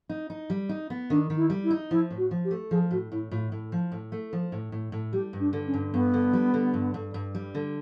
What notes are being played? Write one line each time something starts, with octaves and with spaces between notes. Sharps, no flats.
D#4
D#4
G3
D#4
B3
D#3 D4
D#3
E4
G3
E4
D#4
F3 E4
A2
F#4
F3
G4
A3
F3 G#4
A2 F#4
A2 E4
A2 F4
A2
F3
A2
A3
F3
A2
A2
A2
G3 G4
G2
D4
D3
C#4
G2
G2 B3
D3
G3
D3
G2
G2
G2
G3
D3